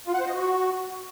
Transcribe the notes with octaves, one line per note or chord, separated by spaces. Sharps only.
F4
F#5
C5
D#5
F#4